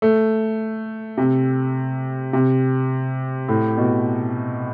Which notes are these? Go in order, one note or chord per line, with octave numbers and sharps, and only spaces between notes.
A3
C3
C3
A2
B2